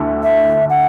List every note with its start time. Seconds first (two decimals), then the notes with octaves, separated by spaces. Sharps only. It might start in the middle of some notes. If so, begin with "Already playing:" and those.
Already playing: D2 D3 A3 E4
0.23 E5
0.70 F#5